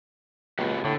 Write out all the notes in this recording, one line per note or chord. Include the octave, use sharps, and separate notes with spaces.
C#2 A#3 F#4 G4
A2 D3